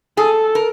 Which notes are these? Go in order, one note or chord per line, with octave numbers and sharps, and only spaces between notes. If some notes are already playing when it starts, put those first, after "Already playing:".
G#4 A4
A#4